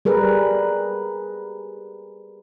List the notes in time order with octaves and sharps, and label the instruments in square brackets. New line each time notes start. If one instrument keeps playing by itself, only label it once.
[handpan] G3 G#4 A#4 B4